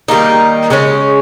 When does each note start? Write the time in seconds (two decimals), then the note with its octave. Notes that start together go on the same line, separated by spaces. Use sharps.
0.08 D#3 G3 A#3 D#4
0.70 C#3 G#3 C#4